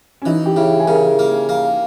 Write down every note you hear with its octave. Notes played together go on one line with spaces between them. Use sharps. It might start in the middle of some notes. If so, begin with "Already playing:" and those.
C#4
E3 D#4
G4
C#3 E4
G#4
C#3 A#4
A#3
A#3